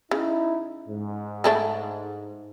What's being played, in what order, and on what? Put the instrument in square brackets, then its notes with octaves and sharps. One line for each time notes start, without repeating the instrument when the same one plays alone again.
[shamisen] C#3 [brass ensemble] D#4 E4
[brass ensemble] G#2
[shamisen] G#3 A3 D4